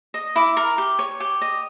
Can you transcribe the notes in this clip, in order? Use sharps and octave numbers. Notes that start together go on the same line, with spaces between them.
D#5
E4 D6
A#4
G4
C#5
G4
D#5